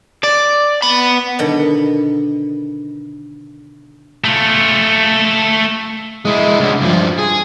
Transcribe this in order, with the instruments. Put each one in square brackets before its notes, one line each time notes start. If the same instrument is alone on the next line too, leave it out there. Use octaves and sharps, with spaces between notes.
[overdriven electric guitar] D5
B3 B5
[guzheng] B2 D3 D#3 G3 F#5 G5
[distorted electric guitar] A3 F4
G#3 E4
C#2 D3
G2 F3
G#4